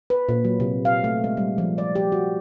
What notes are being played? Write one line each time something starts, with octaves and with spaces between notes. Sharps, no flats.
B4
A#2
F#3
C3
F5
A3
G#3
G3
F3
D5
G4
F#4